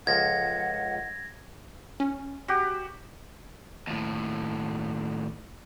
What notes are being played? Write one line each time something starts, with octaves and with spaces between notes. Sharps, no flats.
C#2 F3 A4 F#5 G#6 A#6
C#4
F#4 G4
D#2 A2